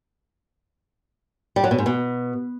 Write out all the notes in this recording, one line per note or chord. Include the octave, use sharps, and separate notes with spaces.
G3
F#3
B2
G#2
B2